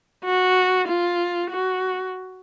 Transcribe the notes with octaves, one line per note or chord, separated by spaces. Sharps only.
F#4
F4
F#4